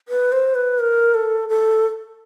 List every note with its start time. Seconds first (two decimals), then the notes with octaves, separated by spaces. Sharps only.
0.08 B4
0.32 C5
0.55 B4
0.79 A#4
1.14 A4
1.49 A4